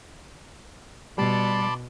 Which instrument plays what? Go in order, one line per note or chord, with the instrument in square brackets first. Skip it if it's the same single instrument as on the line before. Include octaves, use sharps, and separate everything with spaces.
[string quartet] B2 [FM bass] G3 [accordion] D5 C6 D6 [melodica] A5 B5